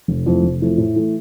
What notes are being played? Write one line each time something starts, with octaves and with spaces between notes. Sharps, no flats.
F1
F2 E3 A3
F1
F2 E3 A3
A2
E3 A3